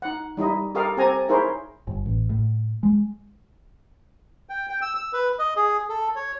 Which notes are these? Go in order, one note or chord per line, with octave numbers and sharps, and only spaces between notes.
D#4 F#5
G3 D#4 E4 D#5
G4 A4 A#4 D#5 F5
C4 G4 A4 G#5 A#5
D#4 E4 G#4 A#4 C5 C#5
G1
A1
A2
G#3
G5
G5
E6
E6
B4
D#5
G#4
A4
C#5